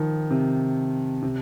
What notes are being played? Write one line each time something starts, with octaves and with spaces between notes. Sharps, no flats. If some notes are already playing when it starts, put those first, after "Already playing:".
Already playing: D#3 F3
C3
C3